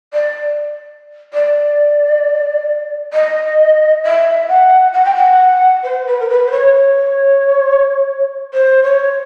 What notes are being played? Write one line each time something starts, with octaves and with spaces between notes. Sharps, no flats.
D5
D5
D#5
E5
F#5
F#5
G5
F#5
C5
B4
A#4
B4
C5
C#5
C#5
C5
C#5